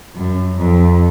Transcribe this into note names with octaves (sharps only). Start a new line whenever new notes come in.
F#2
F2